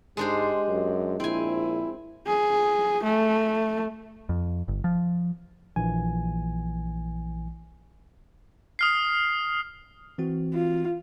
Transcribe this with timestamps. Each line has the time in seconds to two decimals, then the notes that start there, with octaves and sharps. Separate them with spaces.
0.17 G#2 G#3 D4 G4 C5
0.68 F#2
1.20 A#1 C4 E4 G#5
2.27 G#4
3.04 A3
4.29 F2
4.68 G1
4.84 F3
5.76 A#1 E3 G#5
8.79 D#6 F6 C7
10.18 E3 C4 F#4
10.54 F4